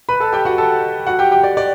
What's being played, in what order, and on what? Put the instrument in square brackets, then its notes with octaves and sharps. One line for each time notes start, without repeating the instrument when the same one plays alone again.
[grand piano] B4 B5
A4 A5
G4 G5
F#4 F#5
A4 A5
F#4 F#5
G4 G5
G4 G5
D5
D5